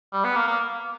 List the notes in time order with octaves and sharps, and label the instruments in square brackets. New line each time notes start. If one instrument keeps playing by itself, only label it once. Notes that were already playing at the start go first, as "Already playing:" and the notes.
[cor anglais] G3
B3
A#3
A#3